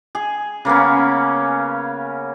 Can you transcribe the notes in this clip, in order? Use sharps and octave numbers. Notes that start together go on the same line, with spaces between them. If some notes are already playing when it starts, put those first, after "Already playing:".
G#4
C#3 A#3 B3 C#4